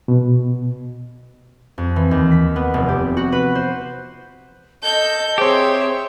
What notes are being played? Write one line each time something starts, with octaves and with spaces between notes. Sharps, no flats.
B2
F2
E3
D#2
B6
B3
F1
G4
F#4
B4
C5
A4 D#5 G6
C4 G4 G#4 C5 C#5 E5